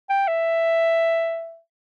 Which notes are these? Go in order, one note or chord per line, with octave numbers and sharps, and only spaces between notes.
G5
E5